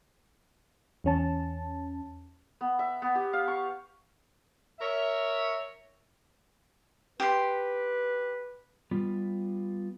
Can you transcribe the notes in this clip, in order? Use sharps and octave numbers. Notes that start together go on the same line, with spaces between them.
E2 C#4 A5
B3
E5
B3
G4
F5
C#6
A#4 C#5 E5
G4 B4 C6
G3 B3 F4